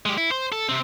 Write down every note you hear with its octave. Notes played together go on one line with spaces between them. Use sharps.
G#3 G4
E4
C5
A4
C3 C4